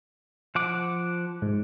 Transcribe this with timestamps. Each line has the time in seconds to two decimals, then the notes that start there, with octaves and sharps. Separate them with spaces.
0.55 F3 F#5 D6
1.42 G#2